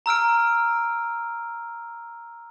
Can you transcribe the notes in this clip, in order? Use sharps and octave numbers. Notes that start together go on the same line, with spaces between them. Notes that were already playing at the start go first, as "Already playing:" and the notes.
A#5 E6 F6 D7